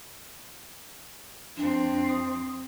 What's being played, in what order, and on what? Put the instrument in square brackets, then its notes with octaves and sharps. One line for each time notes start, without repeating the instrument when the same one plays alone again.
[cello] F2 C4 [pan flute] D4
[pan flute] D#6